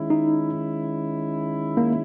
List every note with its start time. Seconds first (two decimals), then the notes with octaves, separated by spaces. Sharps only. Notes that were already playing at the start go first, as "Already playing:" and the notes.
Already playing: D#3 G#3 C#4 E4
0.10 D#4
1.77 A#3